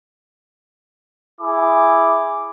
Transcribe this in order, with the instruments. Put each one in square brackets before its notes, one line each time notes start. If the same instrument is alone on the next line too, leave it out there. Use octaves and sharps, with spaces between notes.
[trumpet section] E4 G#4 D6